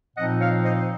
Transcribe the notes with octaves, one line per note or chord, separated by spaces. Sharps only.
A#2 F3 C4 D#4 D#5 F#5
C#5 F5
C5 D#5